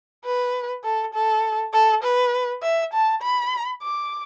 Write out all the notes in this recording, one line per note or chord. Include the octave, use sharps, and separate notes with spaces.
B4
A4
A4
A4
B4
E5
A5
B5
D6